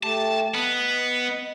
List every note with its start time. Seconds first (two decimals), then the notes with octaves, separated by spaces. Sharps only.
0.03 A3 G4 A5
0.55 B3 D#5 F#5